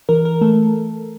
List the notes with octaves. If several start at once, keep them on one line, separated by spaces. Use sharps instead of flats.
E3 A#4
A#4
A3 A4